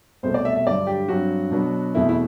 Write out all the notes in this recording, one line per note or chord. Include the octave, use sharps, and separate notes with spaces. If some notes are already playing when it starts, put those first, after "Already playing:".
C2 B2 A3 C5
D5
E5
E5
G2 D3 F#3 D5
G4
G2 F#3 C4 F#4
B2 F#3 B3 D4
E2 B2 A3 C4 E4
E4